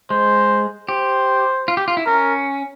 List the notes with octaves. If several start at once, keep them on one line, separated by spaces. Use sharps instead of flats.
G#3 C5
G4 C5
F4
G4
F4
E4
C#4 A#4